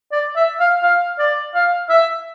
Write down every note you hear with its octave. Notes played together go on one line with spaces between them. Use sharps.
D5
E5
F5
F5
D5
F5
E5